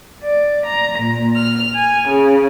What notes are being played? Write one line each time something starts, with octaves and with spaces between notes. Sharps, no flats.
D5
A#5
A#2
F6
G#5
C#3